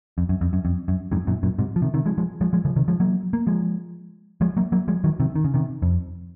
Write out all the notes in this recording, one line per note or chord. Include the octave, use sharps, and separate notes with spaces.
F2
F#2
F2
F#2
F2
F#2
F2 G#2
F#2 A#2
F#2 A#2
G#2 C3
F3
C3 D#3
C3 D#3
F3 G#3
F3 G#3
F3 G#3
F3 G#3
C#3 F3
C3 D#3
F3 G#3
F#3 A#3
A#3
F3 G#3
F3 G#3
F#3 A#3
F#3 A#3
F3 G#3
D#3 F#3
C3 D#3
D#3
C#3
C3 D#3
F2